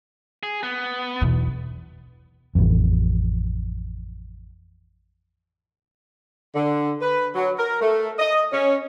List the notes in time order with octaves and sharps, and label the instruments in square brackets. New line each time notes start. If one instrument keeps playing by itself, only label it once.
[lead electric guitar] G#4
B3
[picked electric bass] E1 E2 [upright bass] B1
[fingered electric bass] A1 F2
[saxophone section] D3
B4
F#3
A#4
A3
D#5
C#4